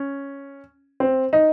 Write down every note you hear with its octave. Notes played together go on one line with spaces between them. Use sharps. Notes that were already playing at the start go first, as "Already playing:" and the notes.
Already playing: C#4
C4
D#4